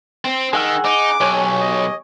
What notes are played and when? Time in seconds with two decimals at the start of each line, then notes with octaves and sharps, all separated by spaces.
0.25 C4
0.53 D#3 G#4 F#5 E6
0.85 D#4 D6
1.21 B1 G4 C#5 G#5
1.60 D#5